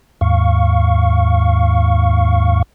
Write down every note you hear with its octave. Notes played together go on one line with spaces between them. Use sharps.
D#2 G#2 F5 C#6